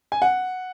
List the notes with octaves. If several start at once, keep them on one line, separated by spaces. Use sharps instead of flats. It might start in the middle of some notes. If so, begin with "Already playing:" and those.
G#5
F#5